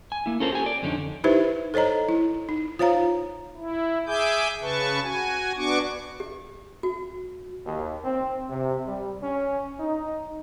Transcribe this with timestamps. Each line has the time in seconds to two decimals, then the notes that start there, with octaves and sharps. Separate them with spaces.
0.12 G#5
0.26 A#3 E4
0.40 C#4 F4 A4 A#4 C5
0.52 G4 G#5
0.66 D5
0.82 F2 D3 C#4 D#4
1.24 D#4 E4 G4 B4 C5 E5
1.74 A4 C5 C#5 D#5 A#5
2.09 E4
2.49 D#4
2.79 F4 C5 C#5 F5 A#5
3.57 E4
4.07 G#4 E5 G#5 D6 G6
4.62 C#3 B4 A5 C#6
5.03 F#4 G#5
5.56 B3 D4 F#4 C#6 D6
6.20 G4
6.83 F#4
7.66 D#2
8.05 C4
8.49 C3
8.87 G3
9.23 C#4
9.80 D#4